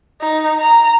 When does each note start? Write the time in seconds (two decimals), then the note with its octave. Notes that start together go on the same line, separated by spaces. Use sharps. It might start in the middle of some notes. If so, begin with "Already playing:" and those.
0.21 D#4
0.60 A#5